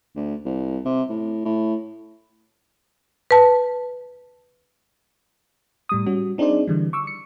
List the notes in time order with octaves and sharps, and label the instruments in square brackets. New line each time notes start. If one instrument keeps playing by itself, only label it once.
[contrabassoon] D2
C2
C3
A2
A2
[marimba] B4 A5
[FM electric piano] A2 G3 D#6
G3 C#4 F#4
C4 D4 D#4 G#4 C5 D5
D3 E3 G3
C#6 D6 E6
C#7